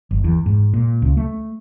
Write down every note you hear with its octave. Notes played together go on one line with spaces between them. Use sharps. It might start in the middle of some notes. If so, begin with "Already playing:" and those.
G1
E2
G#2
A#2
C#2
A3